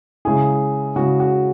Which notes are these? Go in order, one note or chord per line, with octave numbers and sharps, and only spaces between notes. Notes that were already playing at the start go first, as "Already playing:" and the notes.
C#3 G#3 E4 G#4
C#3 G#3 E4 F#4
F#4